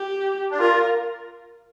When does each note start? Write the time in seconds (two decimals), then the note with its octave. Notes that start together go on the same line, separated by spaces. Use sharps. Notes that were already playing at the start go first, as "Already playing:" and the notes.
Already playing: G4
0.51 D4
0.59 F4 A#4